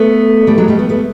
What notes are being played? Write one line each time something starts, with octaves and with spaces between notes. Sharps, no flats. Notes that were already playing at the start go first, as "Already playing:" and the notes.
Already playing: A3 B3
G3 A3
F#3 G#3
G3 A3
A3 B3
A3 B3